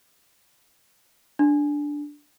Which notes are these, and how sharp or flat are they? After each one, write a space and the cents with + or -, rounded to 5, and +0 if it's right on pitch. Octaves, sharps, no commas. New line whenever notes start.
D4 -5